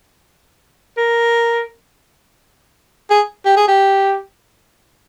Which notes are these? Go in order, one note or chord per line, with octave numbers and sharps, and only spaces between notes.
A#4
G#4
G4
G#4
G4